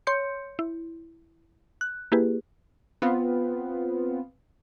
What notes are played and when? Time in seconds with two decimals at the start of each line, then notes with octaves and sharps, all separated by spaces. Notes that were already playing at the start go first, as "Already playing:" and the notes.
0.07 C#5 C6 G6 C#7
0.59 E4
1.81 F#6
2.12 A#3 E4 G4 G#4 B4
3.02 B3 C4 F4